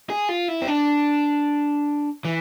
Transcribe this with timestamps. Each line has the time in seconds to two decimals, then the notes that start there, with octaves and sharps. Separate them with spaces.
0.10 G#4
0.29 F4
0.48 E4
0.62 C4
0.68 D4
2.25 E3